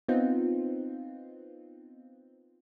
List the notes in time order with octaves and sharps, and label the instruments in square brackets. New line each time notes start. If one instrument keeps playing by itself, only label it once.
[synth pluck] B3 C4 D#4 F4